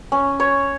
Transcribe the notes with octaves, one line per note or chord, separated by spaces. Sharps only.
C#4
C#5